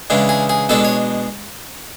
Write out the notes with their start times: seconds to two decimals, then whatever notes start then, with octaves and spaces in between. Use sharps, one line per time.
0.10 C#3 E3 G#3 D4
0.29 G#4
0.49 G#4
0.69 B2 G#3 D4 A4
0.85 C#5